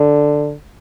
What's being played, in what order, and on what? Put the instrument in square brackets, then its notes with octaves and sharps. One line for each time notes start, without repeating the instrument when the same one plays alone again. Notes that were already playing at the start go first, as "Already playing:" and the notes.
Already playing: [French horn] D3